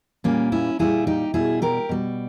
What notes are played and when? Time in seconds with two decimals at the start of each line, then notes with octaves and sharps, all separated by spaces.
0.24 A#2 G3 A#3 C#4
0.52 C#4 E4
0.79 A#2 G3 E4 G#4
1.07 D#4 G4
1.34 B2 G3 E4 G#4
1.62 G4 A#4
1.89 B2 G3